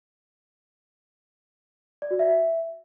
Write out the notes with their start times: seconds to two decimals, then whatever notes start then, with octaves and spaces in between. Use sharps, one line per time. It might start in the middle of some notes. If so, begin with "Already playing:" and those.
2.02 D5
2.11 F#4
2.19 E5